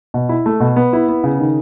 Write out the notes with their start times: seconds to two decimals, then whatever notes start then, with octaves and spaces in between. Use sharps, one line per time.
0.14 B2
0.29 E4
0.46 A3
0.60 B2
0.76 B3
0.93 E4
1.09 B3
1.24 C#3
1.39 D#3